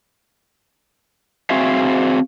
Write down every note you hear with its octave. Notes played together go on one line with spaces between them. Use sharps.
C4 F#4 G#4 C5 E5 F5